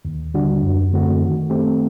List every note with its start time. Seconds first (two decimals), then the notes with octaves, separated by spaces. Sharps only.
0.05 D#2
0.34 D3 G3 D4 F#4
0.62 F#2
0.93 D3 A3 C4 F#4
1.22 D#3
1.50 A3 C4 G4